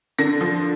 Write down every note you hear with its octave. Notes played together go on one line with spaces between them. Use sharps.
D3 A#6
F3